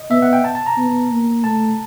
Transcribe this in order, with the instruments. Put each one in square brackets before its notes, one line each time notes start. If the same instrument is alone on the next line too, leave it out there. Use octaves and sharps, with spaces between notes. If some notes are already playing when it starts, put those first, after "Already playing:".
Already playing: [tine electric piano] D#5
[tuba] B3 [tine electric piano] E5
[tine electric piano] F#5
G5
A5
A5
A#5
[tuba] B3
A#3
[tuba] A3 [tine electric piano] A5